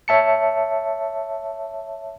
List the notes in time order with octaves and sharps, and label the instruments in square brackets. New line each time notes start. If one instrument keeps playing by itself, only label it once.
[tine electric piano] C#5 E5 A5 C#7